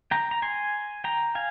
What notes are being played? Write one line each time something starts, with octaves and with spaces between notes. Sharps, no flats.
G5 A#5
A#5
G#5 C6
G5 A#5
F5 G#5